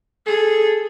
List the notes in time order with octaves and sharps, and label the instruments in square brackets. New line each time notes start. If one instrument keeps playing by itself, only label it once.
[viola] G#4 [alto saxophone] A4